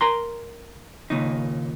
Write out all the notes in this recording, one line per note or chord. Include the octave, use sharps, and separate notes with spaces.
A#4 A#5 C6
D#2 A#2 C#3 D#4